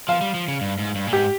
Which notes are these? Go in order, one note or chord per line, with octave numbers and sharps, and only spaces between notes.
F3 F5
G3
F3
C#3
G2
G#2
G2
A#2
G#2 G4